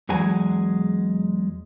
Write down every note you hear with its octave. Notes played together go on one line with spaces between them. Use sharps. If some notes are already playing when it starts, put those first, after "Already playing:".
E2 F#3 G#3 G#5